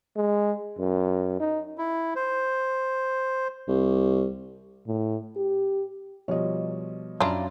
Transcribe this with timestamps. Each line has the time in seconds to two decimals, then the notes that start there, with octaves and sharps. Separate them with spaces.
0.16 G#3
0.79 F#2
1.40 D#4
1.78 E4
2.16 C5
3.68 C2
4.87 A2
5.36 G4
6.28 B2 F3 G3 C#5 D#5
7.21 F#2 D4 E4 F4 A#5